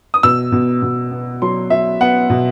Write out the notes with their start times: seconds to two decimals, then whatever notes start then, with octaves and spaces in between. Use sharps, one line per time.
0.14 D#6
0.23 B2 E6
0.52 B2
0.82 B2
1.11 B3
1.42 F#3 C6
1.70 F#3 E5
2.01 B3 F#5
2.30 B2